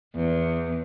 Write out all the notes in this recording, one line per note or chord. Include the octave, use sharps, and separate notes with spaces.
E2